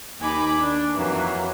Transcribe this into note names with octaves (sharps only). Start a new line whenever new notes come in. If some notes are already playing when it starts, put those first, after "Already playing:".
D#2 D#4 G#5 B5 D6
D4
F2 E3 F#3 A#3